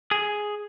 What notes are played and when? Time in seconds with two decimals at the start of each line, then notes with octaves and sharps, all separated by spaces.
0.11 G#4